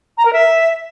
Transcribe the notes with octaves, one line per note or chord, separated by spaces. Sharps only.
A#5
A#4
E5